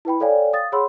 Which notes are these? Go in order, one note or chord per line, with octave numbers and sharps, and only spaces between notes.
E4 B4 G5 B5
A4 C#5 D5 F5 G5 G#5
F5 D#6 A6
G#4 C#5 F#5 B5 C6 E6